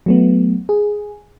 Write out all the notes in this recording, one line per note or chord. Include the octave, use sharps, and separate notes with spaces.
F#3 A3 B3
G#4